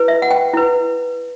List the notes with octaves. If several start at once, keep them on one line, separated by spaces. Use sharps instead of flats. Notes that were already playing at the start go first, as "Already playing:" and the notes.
Already playing: E4 B4
E5
F#5
G5
E4 B4